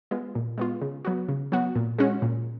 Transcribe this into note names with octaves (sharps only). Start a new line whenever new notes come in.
G#3 B3 F4
A#2
G#3 B3 F4
C#3
F#3 B3 F#4
C#3
F#3 B3 F#4
A#2
G#3 C#4 F#4
A#2